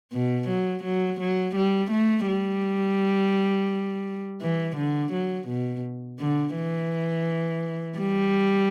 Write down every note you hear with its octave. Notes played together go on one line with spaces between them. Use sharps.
B2
F#3
F#3
F#3
G3
A3
G3
E3
D3
F#3
B2
D3
E3
G3